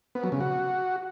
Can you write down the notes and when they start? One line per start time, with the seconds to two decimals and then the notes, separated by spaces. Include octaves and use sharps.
0.15 B3
0.24 F#3
0.32 C#3
0.40 F#4